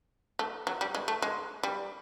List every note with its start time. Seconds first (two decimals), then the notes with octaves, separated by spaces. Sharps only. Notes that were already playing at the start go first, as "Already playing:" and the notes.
0.39 A3
0.67 F#3
0.81 G3
0.95 G#3
1.08 A3
1.22 G#3
1.63 G3